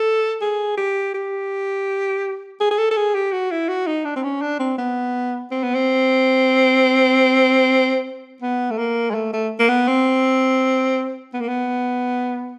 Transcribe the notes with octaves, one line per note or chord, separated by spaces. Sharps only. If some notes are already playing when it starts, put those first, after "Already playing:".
Already playing: A4
G#4
G4
G4
G#4
G#4
A4
A4
G#4
G4
F#4
E4
F#4
D#4
D4
C4
C#4
D4
C4
B3
C4
B3
C4
B3
A3
A#3
G#3
A3
A3
A#3
B3
C4
B3
A#3
B3